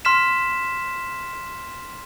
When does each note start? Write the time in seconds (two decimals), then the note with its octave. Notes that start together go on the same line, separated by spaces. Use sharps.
0.05 C6 F6 B6 E7